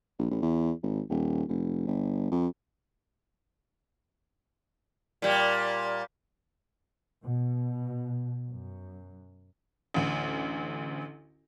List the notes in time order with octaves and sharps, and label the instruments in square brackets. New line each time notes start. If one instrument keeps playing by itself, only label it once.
[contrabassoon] A#1
A1
E2
G#1
D#1
F1
G1
F2
[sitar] A#2 G3
[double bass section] B2
F#2
[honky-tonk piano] A1 D2